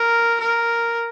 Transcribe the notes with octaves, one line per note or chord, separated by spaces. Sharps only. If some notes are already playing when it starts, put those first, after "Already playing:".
Already playing: A#4
A#4